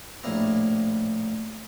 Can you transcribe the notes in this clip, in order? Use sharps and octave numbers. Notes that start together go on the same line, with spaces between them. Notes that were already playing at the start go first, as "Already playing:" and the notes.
A#1 A2 A3 A#3 E4 A#5